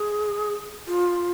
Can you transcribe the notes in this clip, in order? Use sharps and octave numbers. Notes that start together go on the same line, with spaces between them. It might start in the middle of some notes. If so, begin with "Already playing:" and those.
Already playing: G#4
F4